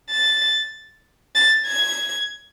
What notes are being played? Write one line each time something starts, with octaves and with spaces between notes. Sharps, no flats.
A6
A6
G#6